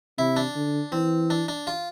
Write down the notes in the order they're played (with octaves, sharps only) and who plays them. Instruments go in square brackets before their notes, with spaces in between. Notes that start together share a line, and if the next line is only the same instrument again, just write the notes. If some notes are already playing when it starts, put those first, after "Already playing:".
[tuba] C3 [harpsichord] E4
[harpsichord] D4
[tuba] D3
[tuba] E3 [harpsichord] C4
[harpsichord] D4
D4
F4